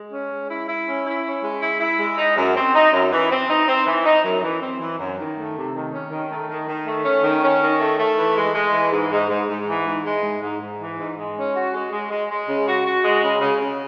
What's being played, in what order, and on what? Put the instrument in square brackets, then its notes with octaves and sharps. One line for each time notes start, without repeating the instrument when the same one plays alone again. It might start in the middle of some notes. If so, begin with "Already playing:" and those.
Already playing: [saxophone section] G#3
C#4
G#3
E4
E4
C#4
E4
C#4
G#3
E4
E4
G#3
D#4
F#2
C4
D#4
F#2
E3
C4
D#4
C4
E3
D#4
F#2
E3
C4
E3
F#2
D#3
A3
C3
D#3
C#4
D#3
A3
D#3
D#3
A3
C#4
D#3
C#4
D#3
A3
A3
E3
G#3
G#3
E3
G#2
G#2
G#2
G#2
E3
G#2
G#3
G#2
G#2
G#2
E3
G#2
G#3
C#4
F#4
G#3
G#3
G#3
G#3
C#3
F#4
F#4
G#3
C#3
C#3
C#3